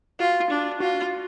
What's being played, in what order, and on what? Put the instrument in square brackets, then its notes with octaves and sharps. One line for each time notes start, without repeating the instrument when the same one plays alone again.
[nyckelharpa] F4 [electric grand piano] F#4
[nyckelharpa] D4
[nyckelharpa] F4 [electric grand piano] F#4